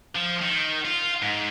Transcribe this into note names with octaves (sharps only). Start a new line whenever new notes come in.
F3
D#3
F4
G#2